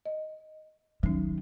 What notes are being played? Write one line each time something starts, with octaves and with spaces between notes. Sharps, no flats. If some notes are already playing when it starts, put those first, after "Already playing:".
D#5
D#3 F#3 C#4